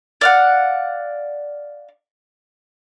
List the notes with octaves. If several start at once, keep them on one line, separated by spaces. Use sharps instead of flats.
D5 F5 F#5